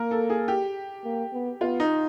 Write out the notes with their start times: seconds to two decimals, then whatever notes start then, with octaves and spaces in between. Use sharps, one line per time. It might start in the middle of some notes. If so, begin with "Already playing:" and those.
Already playing: A#3 A#4
0.11 A4
0.30 G#4
0.48 G4
1.05 A#3
1.33 B3
1.61 B3 F4
1.80 D#4